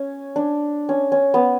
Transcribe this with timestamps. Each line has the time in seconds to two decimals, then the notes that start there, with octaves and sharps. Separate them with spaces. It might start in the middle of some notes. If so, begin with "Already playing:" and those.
Already playing: C#4
0.36 D4
0.89 C#4
1.12 C#4
1.34 B3